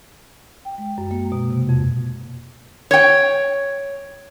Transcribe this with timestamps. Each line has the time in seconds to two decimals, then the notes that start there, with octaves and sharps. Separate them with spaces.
0.65 G5
0.78 G#3
0.98 F#2
1.11 A#3
1.32 B2
1.50 C3
1.69 F2
2.91 C#5 G5